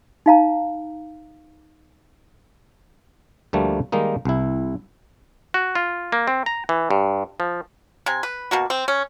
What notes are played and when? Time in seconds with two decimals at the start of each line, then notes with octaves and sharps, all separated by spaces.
0.26 D#4 F5 A#5
3.53 D2 F3 G3 A3 A#3
3.92 D#3 G3 G#3 A#3 D#4
4.25 C2 E4
5.54 F#4
5.75 F4
6.12 A#3
6.28 C4
6.46 A#5
6.69 E3
6.91 G2
7.40 F3
8.06 C3 G#5
8.23 B4
8.51 B2 A#3 F#4
8.70 C4
8.88 C#4